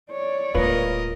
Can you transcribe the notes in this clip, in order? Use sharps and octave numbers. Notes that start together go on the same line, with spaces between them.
C#5 D5
D1 G#3 A#3 F4 A#4 B4 D#5